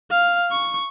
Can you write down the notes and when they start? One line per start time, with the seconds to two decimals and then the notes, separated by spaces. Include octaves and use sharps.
0.11 F5
0.52 C#6